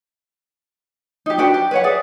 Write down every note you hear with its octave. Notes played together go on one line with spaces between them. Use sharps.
D#4 G4
D4 F#4 B4 G5
G4
B4 C#5 F#5
G#4 B4 D5 E5